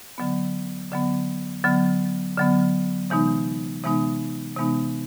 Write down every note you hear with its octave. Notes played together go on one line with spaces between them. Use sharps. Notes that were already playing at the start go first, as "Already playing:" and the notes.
D3 F#3 B3
D3 F#3 B3
D3 F#3 B3
D3 F#3 B3
C3 E3 G#3 B3 D#4
C3 E3 G#3 B3 D#4
C3 E3 G#3 B3 D#4